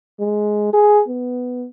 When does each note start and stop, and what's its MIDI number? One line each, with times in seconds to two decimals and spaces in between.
0.20 0.73 56
0.73 1.02 68
1.09 1.67 59